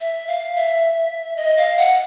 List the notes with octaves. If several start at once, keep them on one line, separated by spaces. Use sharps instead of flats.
E5
F5
E5
D#5
F5
F#5